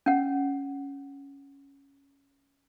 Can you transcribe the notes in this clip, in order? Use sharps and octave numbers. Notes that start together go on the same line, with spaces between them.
C#4 F#5